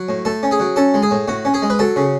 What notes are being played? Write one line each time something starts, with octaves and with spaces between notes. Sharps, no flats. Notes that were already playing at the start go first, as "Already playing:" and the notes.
Already playing: F#3
A2
A2 A4
C#4
G#4
F#3
C#4 A4
G#3
G#4
A2
A2 F#4
C#4
G#4
G#3
B4
F#3 A4
C#3